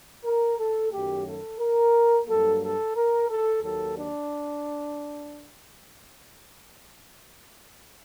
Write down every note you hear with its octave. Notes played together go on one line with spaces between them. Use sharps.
A#4
A4
F#2 D#3 F#3 A3 G4
A4
A#4
G2 F#3 A#3 A4
A4
A#4
A4
D#2 D#3 F#3 A#3 A4
D4